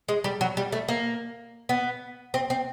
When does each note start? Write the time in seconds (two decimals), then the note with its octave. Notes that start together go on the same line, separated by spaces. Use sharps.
0.08 G#3
0.24 G3
0.41 F#3
0.57 G3
0.72 A3
0.88 A#3
1.69 B3
2.34 C4
2.50 C4